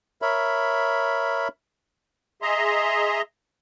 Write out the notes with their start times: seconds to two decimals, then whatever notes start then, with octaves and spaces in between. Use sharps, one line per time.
0.22 A#4 C#5 E5 B5
2.42 G#4 D#5 E5 A#5 C6